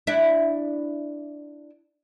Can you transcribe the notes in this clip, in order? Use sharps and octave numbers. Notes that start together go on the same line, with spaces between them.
D4 E4